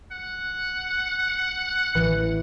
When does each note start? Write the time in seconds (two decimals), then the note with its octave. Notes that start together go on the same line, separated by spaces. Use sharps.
0.12 F#5
1.95 A1 E3